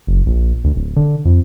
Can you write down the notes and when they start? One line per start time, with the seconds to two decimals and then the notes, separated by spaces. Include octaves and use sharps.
0.07 F#1
0.26 A#1
0.64 D2
0.76 D1
0.96 D3
1.25 F2